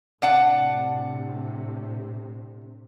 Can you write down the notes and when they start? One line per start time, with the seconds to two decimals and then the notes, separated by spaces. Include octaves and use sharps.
0.22 A2 C3 D4 F#5 A5